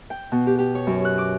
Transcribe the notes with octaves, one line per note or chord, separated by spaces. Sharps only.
G5
B2
G4
G4
C#5
F#2
F#6
D6